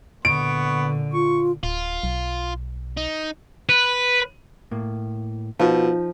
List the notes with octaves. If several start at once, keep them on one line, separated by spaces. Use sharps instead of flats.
A#2 D3 B3 C#6 D7
F4 C#6
D1 F4
B1
D#4
B4
A2 A#3
B2 F3 D#4